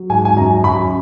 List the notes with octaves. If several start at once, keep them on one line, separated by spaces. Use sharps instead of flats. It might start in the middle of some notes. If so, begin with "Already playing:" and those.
Already playing: F#3
G#2 G#5
G#5
F#2 A#5
F#2 B5